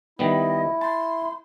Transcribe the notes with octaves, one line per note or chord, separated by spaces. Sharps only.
D#3 G3 B3 E4 D#5
A5 C6